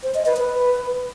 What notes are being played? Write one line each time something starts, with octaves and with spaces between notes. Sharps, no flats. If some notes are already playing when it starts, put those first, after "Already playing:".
C5
D#5
B4
B4